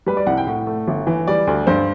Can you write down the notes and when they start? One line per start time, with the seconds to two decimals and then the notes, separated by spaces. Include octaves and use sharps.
0.06 G3 B4
0.17 D5
0.27 C2 F#5
0.37 G5
0.47 A2 F#5
0.67 A3
0.87 G1
1.07 E3
1.28 G3 D5
1.47 D2
1.67 G2 C5